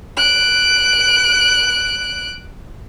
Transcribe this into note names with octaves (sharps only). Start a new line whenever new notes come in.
F#6 D7